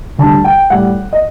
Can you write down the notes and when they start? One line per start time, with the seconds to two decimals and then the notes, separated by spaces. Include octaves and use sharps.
0.18 D2 D3 G3 A5
0.44 G5
0.70 A2 G3 F#5
1.13 D#5